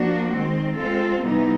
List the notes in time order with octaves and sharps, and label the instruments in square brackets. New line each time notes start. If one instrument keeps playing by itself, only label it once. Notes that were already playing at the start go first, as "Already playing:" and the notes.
Already playing: [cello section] F3 A#3 D4 F#4
D#3 G#3 C4
G#3 C4 F4 A4
C3 E3 G3 B3 D#4